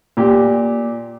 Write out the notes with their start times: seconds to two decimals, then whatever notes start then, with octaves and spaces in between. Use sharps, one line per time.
0.17 A#2 G4